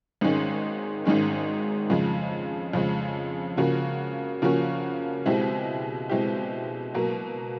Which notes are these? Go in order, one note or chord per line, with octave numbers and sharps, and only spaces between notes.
G#1 G#2 D#3 G#3 C#4
G#1 G#2 D#3 G#3 C#4
F2 C#3 F3 G#3
F2 C#3 F3 G#3
C#3 F3 A#3 C#4 F#4
C#3 F3 A#3 C#4 F#4
B2 G#3 C4 E4 G4
B2 G#3 C4 E4 G4
B2 F#3 A#3